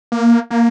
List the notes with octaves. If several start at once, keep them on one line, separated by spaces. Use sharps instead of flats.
A#3
A#3